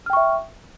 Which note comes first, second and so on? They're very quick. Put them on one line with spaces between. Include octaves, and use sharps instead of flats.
F6 G5 C#6 E5